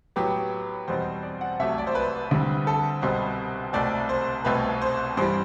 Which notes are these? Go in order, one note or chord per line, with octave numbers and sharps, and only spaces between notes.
A2 F#3 B3 G4
E2 B2 G3 C4 C5
D5
F#5
C2 C3 F#3 A3 E5
D5
C5
B4
D2 D3 G3 C4
A4
C2 B2 G3 C4 C5
C2 B2 A3 C4 D5
C5
C2 B2 A3 C4 B4
C5
G2 E3 G3 C5